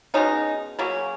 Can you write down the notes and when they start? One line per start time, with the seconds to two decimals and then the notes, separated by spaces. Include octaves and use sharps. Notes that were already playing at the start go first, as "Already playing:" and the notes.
0.14 B2 G#3 C#4 D#4
0.79 C#3 F#3 A#3 C#4